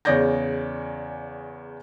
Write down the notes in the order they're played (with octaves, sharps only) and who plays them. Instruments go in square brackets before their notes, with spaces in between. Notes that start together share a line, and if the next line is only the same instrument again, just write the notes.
[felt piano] E2 C#3 C#5 D5 G6 A#6